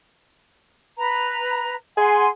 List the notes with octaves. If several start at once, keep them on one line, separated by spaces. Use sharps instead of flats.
B4 A#5
G#4 F#5 G#5 C6